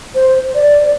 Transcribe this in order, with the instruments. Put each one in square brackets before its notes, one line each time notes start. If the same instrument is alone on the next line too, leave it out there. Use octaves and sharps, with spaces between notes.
[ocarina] C5
D5